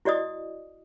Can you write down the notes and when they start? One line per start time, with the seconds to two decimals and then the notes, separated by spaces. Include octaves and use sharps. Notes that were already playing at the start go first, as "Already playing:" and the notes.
0.05 E4 F#4 D5 D#5 D#6